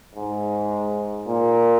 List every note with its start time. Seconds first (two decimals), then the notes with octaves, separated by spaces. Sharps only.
0.16 G#2
1.26 A#2